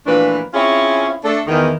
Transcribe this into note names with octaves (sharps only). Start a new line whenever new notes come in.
A#2 E3 F3 A3 D4 B4
C4 C#4 E4 F4 G#4 C#5
A3 D4 A4
E2 D#3